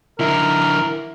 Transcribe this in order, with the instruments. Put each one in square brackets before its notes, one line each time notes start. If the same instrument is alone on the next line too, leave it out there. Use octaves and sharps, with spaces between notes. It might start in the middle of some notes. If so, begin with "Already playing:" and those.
[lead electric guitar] D3 E3 [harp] E4 [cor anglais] A#4